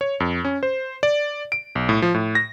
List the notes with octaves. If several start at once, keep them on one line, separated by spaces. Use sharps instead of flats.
C#5
F2
C#4
C5
D5
D7
B1
A2
F3
A2
A#6